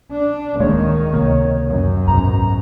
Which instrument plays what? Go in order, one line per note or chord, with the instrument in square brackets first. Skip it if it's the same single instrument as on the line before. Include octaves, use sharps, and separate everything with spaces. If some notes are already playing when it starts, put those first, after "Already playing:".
[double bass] D4
[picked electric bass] D1 G#3 A#3 [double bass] D#3 [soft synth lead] C#5
[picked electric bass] C#2 C3 A#3
[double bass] F#2
[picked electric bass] C2 G#2 B2 [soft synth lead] A#5